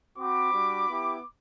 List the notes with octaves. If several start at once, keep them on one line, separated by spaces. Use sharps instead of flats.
C4 F#4 B5 D6
G3 D4 F#4
B3 E4 G4